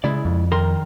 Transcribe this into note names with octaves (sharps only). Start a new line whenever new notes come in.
C#3 G#3 E4 D5
F2
D#3 A#4 C6